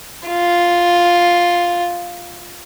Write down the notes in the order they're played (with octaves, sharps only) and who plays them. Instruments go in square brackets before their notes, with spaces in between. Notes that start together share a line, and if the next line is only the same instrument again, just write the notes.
[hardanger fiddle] F4